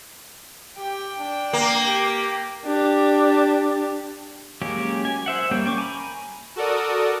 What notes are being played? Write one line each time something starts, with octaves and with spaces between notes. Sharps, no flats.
G4 G5
D4
A#3
G4
D4 G4
F#3 G#3 A#3 C#4 G4
G#5
C5 E5 F#5
G3 A#3 C#4 G5
G5 C#6 D6
G#5 A#5 B5
F#4 A4 A#4 D5 D#6